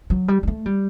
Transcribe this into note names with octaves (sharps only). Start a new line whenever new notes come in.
F#3
G3
G3
A3
G3